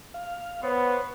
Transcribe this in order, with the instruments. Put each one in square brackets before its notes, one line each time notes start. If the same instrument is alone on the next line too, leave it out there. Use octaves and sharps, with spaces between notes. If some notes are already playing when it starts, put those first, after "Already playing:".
[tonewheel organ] F5
[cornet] B3 [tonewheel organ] C5 C#5